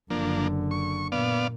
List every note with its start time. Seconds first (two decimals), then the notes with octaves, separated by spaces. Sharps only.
0.10 F#1 D3 F3 A#3 D4
0.71 C#6
1.12 A#2 B3 D5 F5